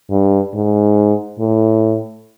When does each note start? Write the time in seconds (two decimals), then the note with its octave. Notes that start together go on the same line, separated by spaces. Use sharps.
0.10 G2
0.54 G#2
1.39 A2